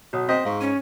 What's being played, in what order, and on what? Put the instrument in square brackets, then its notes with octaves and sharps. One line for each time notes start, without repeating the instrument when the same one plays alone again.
[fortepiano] B1 [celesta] F#4 C#5 D#6
[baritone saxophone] C4 [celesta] C5 G6 B6 [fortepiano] D#5
[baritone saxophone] G#2 [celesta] F5 C#6
[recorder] C#4 [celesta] D#7